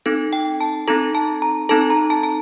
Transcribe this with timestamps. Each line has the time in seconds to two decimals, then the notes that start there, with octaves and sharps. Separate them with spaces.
0.06 C4 D#4 A4
0.33 G5
0.61 A5
0.88 C4 D#4 A4 A#5
1.15 A5
1.42 A#5
1.69 C4 D#4 A4 A5
1.90 A#5
2.10 A5
2.23 A5